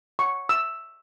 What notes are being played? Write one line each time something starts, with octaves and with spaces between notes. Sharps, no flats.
C#6
E6